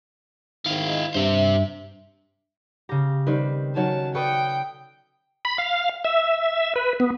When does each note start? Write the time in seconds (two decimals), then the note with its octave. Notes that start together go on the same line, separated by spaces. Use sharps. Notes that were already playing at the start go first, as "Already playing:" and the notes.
0.66 G#2 D#3 E4 F5
1.14 G2 G4 C5 E5
2.89 C#3 G4 A#5
3.27 D#3 G3 C4 B4
3.76 D#3 F#3 C#4 A5
4.15 A4 B4 D5 G5 C#6 D#6 C#7
5.45 B5
5.58 F5
6.04 E5
6.76 B4
7.00 B3